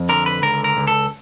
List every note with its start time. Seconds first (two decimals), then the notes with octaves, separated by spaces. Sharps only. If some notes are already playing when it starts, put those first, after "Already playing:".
Already playing: F2
0.09 D3 A#4
0.26 B4
0.42 C#2 A#4
0.64 A#4
0.77 C#2
0.87 A4